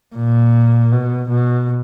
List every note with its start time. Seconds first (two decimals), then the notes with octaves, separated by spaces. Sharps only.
0.16 A#2
0.92 B2
1.30 B2